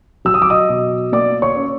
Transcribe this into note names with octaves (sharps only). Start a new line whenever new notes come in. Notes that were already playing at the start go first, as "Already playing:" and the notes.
F#3 E6
D#6
D6
D#5 D#6
B2
A#3 D5 D6
C#5 C#6
C#4